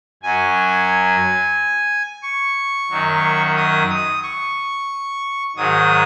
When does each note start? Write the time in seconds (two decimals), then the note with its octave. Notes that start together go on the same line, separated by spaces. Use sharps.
0.23 F#2 F#3 G#5
2.23 C#6
2.90 F#2 D#3 F#3
3.56 D#6
3.89 D#6
4.23 C#6
5.56 G#2 D#3 F#3 D#6